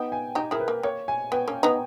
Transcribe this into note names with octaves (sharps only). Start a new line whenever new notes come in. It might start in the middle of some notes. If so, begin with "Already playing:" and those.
Already playing: B3 D#4 G5
G#5
D#4 G4 G5
E4 G#4 A#4
B4
A#3
A#3 C#5
G#5
B3 G5
A#3 C#4
B3 D#4